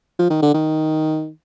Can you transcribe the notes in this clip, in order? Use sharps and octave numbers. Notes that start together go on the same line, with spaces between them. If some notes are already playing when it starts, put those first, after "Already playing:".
F3
D#3
D3
D#3